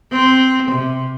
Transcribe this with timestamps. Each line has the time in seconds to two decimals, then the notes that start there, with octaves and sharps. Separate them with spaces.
0.12 C4
0.71 C3